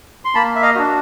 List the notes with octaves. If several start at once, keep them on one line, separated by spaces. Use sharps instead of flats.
C6
A#3 A5 B5
E5
D#5 F5
D4 F#4